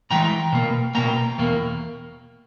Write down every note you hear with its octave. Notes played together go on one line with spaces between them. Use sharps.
G#2 E3 G#3 G5 A#5
B2 A#3
B2 A#3 G5 A#5
E2 B2 A#3